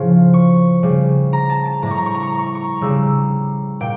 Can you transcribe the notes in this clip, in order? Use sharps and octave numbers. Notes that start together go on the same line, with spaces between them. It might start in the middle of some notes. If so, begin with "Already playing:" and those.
Already playing: A2 C#3 F3
C#6
C#3 G3
A#5
A5
A5
A2 G3 A#5
C#6
A#5
C#6
A#5
C#6
A#5
C#6
A#5
C#6
A#5
C#3 G3 E6
A#2 G5